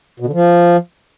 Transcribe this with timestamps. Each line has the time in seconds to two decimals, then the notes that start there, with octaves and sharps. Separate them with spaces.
0.20 B2
0.26 D3
0.33 F3